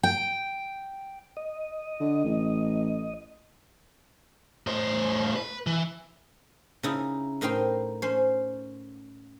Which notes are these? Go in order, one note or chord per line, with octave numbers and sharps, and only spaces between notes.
G5
D#5
D3
A1
A2 C5
B4
E3
C#3 D#4 E4
A2 D#4 A#4 C5 G5 C6
C#4 C5